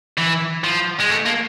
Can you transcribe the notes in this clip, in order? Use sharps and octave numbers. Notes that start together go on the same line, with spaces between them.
E3
F3
G#3
A3
A#3